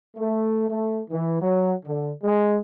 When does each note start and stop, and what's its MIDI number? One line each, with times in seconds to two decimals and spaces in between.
0.16 0.67 57
0.68 1.00 57
1.10 1.39 52
1.41 1.72 54
1.86 2.11 50
2.23 2.58 56